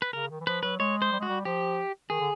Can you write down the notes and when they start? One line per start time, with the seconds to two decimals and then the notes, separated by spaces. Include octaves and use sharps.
0.02 B4
0.13 C#3 A#4
0.31 D#3
0.40 E3
0.46 F3 B4
0.63 F#3 B4
0.79 G#3 C#5
1.02 C5
1.12 G3
1.20 G#3 F#4
1.28 G3
1.45 F3 G4
2.10 D#3 G#4
2.20 D3